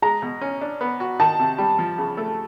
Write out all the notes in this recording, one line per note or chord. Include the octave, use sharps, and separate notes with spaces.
G#3 A#5
B2
C#4
D4
B3
F#4
D#3 A5
C3
G3
F3
C#3
A3